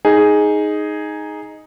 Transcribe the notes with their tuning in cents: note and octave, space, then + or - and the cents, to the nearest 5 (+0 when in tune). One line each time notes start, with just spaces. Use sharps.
D#4 +0 G#4 +0